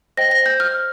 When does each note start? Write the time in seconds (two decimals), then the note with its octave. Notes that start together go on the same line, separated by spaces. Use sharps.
0.17 C5 D#5 G5 A#6
0.31 A#6
0.46 G6
0.60 F6